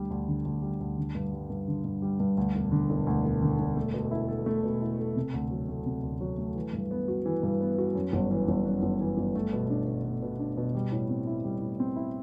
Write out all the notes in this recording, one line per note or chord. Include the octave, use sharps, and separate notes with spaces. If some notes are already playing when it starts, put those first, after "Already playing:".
Already playing: D2 D3 G3
D2
D3
D2
G3
D2
D3
G2
G3
G2
D3
G2
G3
G2
D2
E1
D3
E1
D2
E1
D3
E1
A3
B2
E4
A4
A3
B2
E4
A4
C3
D2
F#3
A3
C3
D2
F#3
A3
E3
G2
B3
F#4
E3
G2
B3
F#4
F#2
G1
E3
G1
F#2
G1
E3
G1
A3
B2
D4
B2
A3
B2
D4
B2
G3
A2
C4
E4
G3
A2
C4
E4